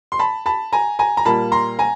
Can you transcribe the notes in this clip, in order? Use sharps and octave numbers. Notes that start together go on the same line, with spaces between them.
C6
A5 B5
A5 B5
G#5 A#5
G#5 A#5
A#5
A#2 G3 A#3 A5 B5
A#5 C6
G#5 A#5